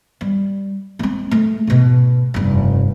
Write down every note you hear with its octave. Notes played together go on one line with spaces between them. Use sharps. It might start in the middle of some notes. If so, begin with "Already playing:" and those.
G3
G#3 C4
A3
G#2 B2
F1 G2